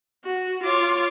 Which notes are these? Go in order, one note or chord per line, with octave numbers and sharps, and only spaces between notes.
F#4
F4 C#5 D6